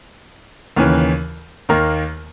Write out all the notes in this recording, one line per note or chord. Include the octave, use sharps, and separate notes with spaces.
D#2 C#3 E3
D#2 D#3 A#3